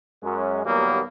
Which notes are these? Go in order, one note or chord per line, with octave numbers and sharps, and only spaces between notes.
F#2 G#3 C#4
D#2 A#2 F#3 G3 A#3 B3